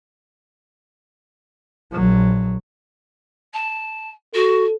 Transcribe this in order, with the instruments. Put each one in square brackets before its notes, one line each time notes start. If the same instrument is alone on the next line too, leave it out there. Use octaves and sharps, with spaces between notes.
[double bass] A#1 F#3
[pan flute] A5
[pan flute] F#4 [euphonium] A4